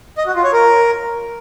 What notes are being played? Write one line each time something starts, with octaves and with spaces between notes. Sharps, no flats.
D#5
F#4
F4
C#5
A#4